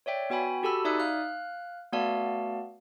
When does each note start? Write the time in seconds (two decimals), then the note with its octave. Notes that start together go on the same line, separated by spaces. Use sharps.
0.06 C#5 D5 E5 G5
0.30 B3 F#4 G5 G#5 B5
0.63 F#4 G4 A4 A5 B5 E6
0.85 D#4 D5 E5 D#6 F#6
1.00 F5 F6 F#6
1.92 A3 B3 F#4 D5 F5 A5